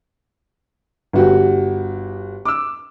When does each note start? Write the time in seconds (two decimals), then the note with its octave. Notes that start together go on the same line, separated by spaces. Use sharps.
1.13 G1 F#4 G4
2.45 D6 E6